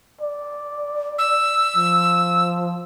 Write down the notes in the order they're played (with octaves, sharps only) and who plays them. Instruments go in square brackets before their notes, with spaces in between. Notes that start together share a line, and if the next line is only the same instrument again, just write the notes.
[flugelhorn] D5
[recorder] E6
[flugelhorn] F3